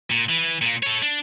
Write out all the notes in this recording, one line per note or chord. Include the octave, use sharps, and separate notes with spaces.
A#2
E3
A#2 A#3
A4 C#5
D4